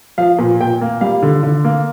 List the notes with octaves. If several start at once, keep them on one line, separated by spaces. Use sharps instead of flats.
F3 F5
A#2
A#2 G5
A#3
G3 F5
D3
D3
A#3